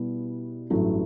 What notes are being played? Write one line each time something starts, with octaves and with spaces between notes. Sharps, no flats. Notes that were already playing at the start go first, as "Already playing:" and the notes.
Already playing: B2 G3 B3 E4
A1 G2 F#3 A3 E4